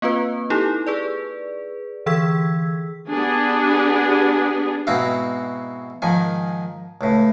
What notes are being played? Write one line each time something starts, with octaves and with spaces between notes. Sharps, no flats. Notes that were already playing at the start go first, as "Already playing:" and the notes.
A#3 C4 F4 B4
D#4 E4 G4 A4
G#4 B4 D5
D3 E3 G#4 E6 G#6 B6
B3 D4 G4 G#4
G#2 B2 C4 E4 F#4 F5
G#2 D#3 F3 G#5
C#2 A2